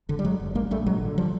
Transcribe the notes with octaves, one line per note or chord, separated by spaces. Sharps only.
E1 D3
G3
F#1 F#3 G#3
F#1
A#1 G#3 A#3
A#1 G3 A3
G#1 F#3 G#3
D3
F3 G3